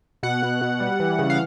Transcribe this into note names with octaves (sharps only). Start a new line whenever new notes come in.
B2 F#5
B2
B2
G3
E3
C#3
F5